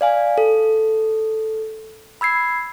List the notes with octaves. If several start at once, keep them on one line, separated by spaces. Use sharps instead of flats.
D5 F5 G#5
A4
B5 E6 G#6 C7